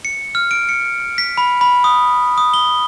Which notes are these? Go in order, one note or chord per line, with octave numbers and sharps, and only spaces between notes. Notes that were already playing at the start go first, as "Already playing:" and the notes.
C#7
F6
D7
C#7
B6
B5
B5
D#6
D#6
G7